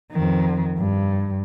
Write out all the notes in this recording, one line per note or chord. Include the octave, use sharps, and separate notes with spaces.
F2 D#3
G2